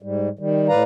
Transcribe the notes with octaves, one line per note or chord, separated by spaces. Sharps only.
G#2 G3
D#3 G3
A2 B4 D5 F5 A#5